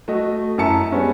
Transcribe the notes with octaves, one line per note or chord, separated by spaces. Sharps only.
A3 F#4 D#5
F#2 E4 A#4 E5 A5 C#7
G3 G#3 B3 C#4